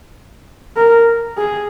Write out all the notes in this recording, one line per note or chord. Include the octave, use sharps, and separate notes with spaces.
A#4
G#4